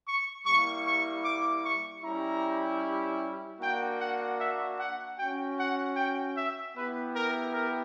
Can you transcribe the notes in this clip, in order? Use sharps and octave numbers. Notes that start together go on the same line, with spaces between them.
C#6
G3 A#3 E4 C#6
C#6
D6
C#6
G3 C#4 E4 G4 A#5
A#3 D4 F#4 G5
F#5
E5
F#5
C#4 F#4 G5
F#5
G5
E5
B3 E4 G4 B4
A#4
A#4